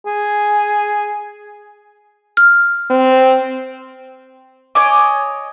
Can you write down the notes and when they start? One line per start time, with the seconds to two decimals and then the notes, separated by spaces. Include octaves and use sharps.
0.06 G#4
2.37 F6
2.90 C4
4.75 C#5 D#5 G#5 D6